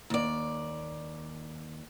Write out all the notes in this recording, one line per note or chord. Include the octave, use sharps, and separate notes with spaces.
D#2 D5